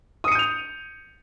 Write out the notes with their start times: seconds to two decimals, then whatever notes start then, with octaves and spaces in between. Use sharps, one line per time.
0.24 D#6
0.28 C#7
0.32 D#7
0.35 G6
0.39 F7